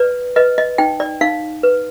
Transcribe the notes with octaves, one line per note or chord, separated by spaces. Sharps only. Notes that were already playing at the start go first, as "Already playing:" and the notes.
Already playing: B4 D5
B4 D#5
D#5
D#4 G5
D5
D#4 F5
B4